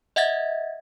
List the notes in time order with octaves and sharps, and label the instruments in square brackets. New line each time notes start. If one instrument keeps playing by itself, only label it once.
[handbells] D#5 E5 F#5 G#6 A6